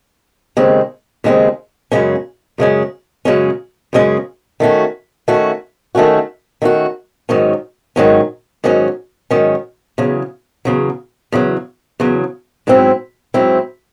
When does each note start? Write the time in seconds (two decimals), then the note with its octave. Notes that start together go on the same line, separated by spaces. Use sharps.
0.57 D#2 C#3 G#3 C4
1.24 D#2 C#3 G#3 C4
1.92 F#2 C#3 G#3 C#4
2.58 F#2 C#3 G#3 C#4
3.25 F#2 C#3 G#3 C#4
3.93 F#2 C#3 G#3 C#4
4.60 D#3 A3 C#4 F#4
5.28 D#3 A3 C#4 F#4
5.95 D#3 A3 C#4 F#4
6.62 D#3 A3 C#4 F#4
7.29 G#2 D#3 F#3 C#4
7.96 G#2 D#3 F#3 C#4
8.64 G#2 D#3 F#3 C#4
9.31 G#2 D#3 F#3 C#4
9.98 E2 C#3 F#3
10.65 E2 C#3 F#3
11.32 E2 C#3 F#3
12.00 E2 C#3 F#3
12.67 G#2 F#3 C4 E4
13.34 G#2 F#3 C4 E4